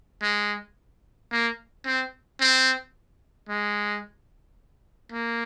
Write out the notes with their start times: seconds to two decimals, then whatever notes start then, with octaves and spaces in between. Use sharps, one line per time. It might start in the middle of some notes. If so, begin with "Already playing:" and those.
0.22 G#3
1.31 A#3
1.86 C4
2.40 C4
3.49 G#3
5.12 A#3